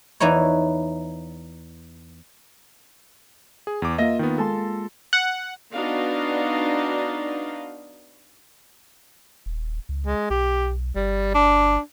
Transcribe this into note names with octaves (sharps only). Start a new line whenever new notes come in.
E2 E3 D#4 E4 C#5
G#4
E2 D6
A#3 F4 D#5 E5 A#6
D#3 B3
G#3 A4 A5 C6
F#5
B3 D4 D#4 F#4 D#5 F5
D#1
C#2
G#3
B1 G4
G1 G3
D4